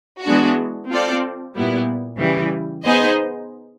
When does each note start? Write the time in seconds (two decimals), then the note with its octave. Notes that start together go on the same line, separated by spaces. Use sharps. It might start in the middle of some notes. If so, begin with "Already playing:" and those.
0.24 E3 G#3 B3 D4 F#4
0.89 C4 F4 A4 D5
1.54 A#2 G3 B3 E4
2.19 C#3 E3 G3
2.83 B3 D#4 G#4 C5 D#5